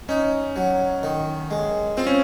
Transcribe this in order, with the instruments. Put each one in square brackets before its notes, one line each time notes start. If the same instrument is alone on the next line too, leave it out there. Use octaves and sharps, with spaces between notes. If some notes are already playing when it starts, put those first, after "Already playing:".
[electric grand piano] C#4 [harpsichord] D#4
[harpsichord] F#3
D#3
G#3
[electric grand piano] C4 [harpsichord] F4
[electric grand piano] C#4